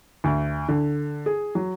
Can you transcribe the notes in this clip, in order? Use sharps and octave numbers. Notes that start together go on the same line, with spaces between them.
D2
D3
G#4
F#3